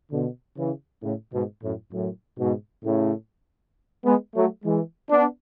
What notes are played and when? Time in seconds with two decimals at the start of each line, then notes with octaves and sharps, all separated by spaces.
0.11 B2 D3
0.57 C#3 E3
1.02 A2 C#3
1.32 G#2 B2
1.62 F#2 A2
1.92 F#2 A2
2.38 G#2 B2
2.83 A2 C#3
4.04 G#3 B3
4.35 F#3 A3
4.64 E3 G#3
5.10 B3 D4